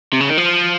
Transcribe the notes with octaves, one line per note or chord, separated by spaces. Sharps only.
C3
C#3
D#3
F3